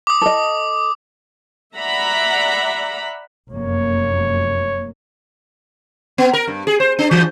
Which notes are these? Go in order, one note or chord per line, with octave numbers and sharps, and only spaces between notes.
D6 D#6
A4 D#5
D5 E5 F#5 A#5 B5
F1 F#2 A#3 C#5
B3
A#4
G2
G#4
C5
D4
E3